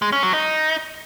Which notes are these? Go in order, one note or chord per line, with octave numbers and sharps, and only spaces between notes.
G#3
C#4
F#3
D#4